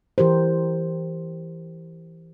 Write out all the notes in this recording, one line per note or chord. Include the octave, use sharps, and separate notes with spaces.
E3 G4 A#4 C5